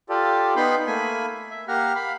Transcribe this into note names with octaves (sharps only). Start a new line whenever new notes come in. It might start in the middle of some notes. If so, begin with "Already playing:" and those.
F4 G4 A4 D5
B3 D#4 G5 B5 C6
A3 A#3 G#5 B5
E5
A#3 G4 F#5 A#5 F6
F5 B5